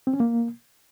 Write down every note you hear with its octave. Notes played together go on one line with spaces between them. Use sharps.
C4
C#4
A#3